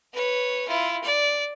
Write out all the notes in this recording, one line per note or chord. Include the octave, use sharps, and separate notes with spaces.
B4 C#5
E4 F4
D5